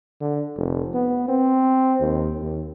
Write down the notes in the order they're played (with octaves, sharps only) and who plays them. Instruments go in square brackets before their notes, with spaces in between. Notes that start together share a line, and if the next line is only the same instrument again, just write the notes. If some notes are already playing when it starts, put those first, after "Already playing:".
[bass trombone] D3
F1
B3
C4
D#2
D#2